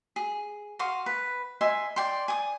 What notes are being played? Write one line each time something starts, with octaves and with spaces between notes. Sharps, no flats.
G#4
F#4 F5 C6 D#6
B4
D#5 E5 G#5 C6
D5 G5 C6
G#5 D#6